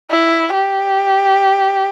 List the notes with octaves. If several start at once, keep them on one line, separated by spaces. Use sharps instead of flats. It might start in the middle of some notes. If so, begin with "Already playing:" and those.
E4
G4